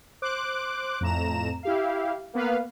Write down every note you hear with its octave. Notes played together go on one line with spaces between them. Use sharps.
C5 D6 F#6
F2 A2 A#5 E7
E4 G4 F5
A#3 B3 B4 F5